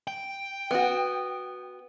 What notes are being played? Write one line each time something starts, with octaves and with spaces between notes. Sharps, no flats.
G5
B3 F#4